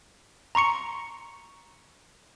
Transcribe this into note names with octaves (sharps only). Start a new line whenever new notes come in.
A#5 C6 C#6 C#7